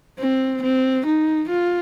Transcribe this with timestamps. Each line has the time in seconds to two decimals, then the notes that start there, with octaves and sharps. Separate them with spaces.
0.19 C4
0.62 C4
1.06 D#4
1.49 F4